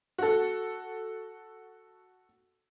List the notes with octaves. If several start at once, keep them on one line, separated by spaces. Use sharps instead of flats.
F#4 A4